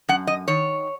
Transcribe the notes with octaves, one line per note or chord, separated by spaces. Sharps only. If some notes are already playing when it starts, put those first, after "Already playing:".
F#2 F#5
D#5
D#3 C#5